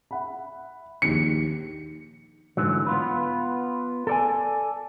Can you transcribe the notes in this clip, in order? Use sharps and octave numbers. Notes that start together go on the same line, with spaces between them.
E5 F#5 B5
A#1 D#2 D#3 C#7
G#2 D3 E3 F#3
B3 F4 B4
A4 D5 G#5